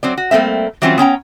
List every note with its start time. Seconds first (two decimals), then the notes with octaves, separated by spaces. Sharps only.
0.03 F#3 C4 D5
0.18 F#4
0.31 G3 A3 A#3 C4 E5
0.82 E3 F#3 G3 C4 C#4 F4
0.98 B3 C#4 G5 A#5